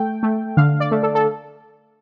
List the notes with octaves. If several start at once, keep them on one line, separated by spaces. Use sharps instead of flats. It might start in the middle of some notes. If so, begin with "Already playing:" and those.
Already playing: A3 G5
A3
D3 F5
D5
A3
A4
A4